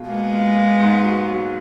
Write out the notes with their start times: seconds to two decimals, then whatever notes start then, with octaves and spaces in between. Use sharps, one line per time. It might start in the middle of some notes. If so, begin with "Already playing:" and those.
Already playing: B2 F4 G#4
0.08 G#3 A#3 B3
0.32 F4
0.56 A#3
0.80 G#2
1.03 F#4
1.27 F#3